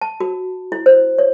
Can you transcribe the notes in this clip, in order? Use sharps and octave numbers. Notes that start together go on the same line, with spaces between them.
A5
F#4
E4
C5
C#5